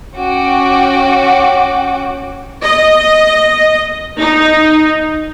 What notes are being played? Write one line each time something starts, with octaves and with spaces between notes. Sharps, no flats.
C#4 F#4 F#5 G5 D6
D#5
D#4